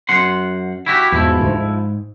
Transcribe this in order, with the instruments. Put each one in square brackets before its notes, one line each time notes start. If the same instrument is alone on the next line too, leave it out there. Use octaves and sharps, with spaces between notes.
[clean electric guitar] F#2 F#5 C6
E4 F#4 G4
[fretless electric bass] E2 G#2 B2 [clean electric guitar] F3 E4
[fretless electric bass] G#1 D2 G#2
G#2